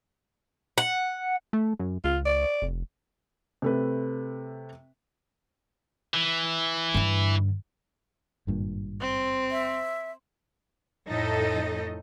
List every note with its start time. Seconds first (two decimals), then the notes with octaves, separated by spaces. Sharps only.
0.78 F#5
1.53 A3
1.79 F#2
2.04 C#2 F4
2.25 D5
2.62 F1
3.62 C3 A3 B4
6.14 E3
6.94 G2 D3
8.47 G#1 G2 A#2
9.01 C4
9.51 E5
11.09 F2 A2 D#4 A4 D#5